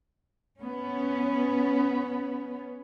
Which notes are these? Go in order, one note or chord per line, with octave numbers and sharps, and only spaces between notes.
B3 C#4